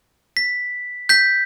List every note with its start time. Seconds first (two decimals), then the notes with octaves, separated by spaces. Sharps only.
0.37 B6
1.09 G6 B6